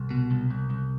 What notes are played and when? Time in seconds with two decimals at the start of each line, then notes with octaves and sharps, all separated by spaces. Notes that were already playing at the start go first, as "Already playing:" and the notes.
Already playing: C2
0.11 B2
0.31 C2
0.50 C2
0.70 C2